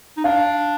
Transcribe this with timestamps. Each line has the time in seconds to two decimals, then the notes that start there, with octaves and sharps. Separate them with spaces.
0.17 D#4
0.24 D4 F5